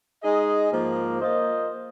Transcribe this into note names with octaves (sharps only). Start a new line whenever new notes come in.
G#3 D#4 G#4 D#5
G#2 F3 A#3
A#3 F4 C5 D#5